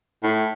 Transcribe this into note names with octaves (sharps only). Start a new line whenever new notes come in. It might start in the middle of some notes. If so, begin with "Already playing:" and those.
A2